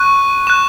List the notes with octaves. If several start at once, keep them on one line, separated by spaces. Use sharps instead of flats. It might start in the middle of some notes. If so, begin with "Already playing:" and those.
Already playing: C#6 F#6 D#7
C#6 F#6 E7